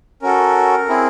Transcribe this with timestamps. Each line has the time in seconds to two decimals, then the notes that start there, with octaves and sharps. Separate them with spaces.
0.22 C#4 F#4 A4 A#4
0.89 C4 E4 G#4